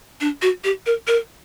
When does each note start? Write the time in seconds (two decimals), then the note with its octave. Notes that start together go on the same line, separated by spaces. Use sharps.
0.21 D4
0.42 F#4
0.64 G4
0.86 A#4
1.07 A#4